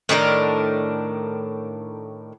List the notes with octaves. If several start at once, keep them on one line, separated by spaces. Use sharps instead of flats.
A2 D#3 D4 A#4